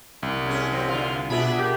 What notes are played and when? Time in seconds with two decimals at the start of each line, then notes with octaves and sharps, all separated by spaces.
0.23 C2
0.46 C#4 G#4
0.71 F#3 C4
0.88 D3 F4
1.30 B2 B3 D4 F4 G#4 E5 B5
1.59 G4 A#4